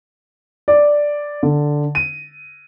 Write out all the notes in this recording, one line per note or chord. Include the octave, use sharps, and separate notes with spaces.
D5
D3
D#7